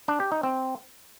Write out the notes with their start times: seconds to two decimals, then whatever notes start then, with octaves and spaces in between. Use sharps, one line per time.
0.08 D4
0.20 G4
0.32 D#4
0.43 C4